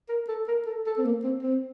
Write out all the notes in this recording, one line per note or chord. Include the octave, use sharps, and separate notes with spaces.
A#4
A4
A#4
A4
A4
C4
A#3
C4
C4